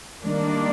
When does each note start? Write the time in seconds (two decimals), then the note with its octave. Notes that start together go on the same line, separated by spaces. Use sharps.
0.24 D#3 G3 A#3 D4